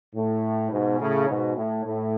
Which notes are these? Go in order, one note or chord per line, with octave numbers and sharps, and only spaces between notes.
A2
G#2 B2
A2 C#3
G#2 B2
A2
A2